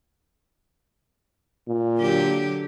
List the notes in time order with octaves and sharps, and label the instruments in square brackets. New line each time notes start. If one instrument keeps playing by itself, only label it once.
[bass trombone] A#2
[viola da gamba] D3 F#3 G4